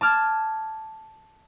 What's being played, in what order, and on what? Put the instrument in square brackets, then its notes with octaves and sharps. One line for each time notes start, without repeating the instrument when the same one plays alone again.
[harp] A5 D6 F6 G#6